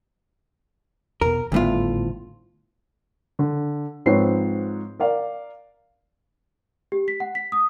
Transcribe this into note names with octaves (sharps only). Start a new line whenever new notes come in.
E2 B2 A#4
G#1 D2 A2 G3 B3 F4
D3
G#2 F3 C4 B4 C#5 C7
A#4 D5 F5
G4
B6
F#5
B6
D#6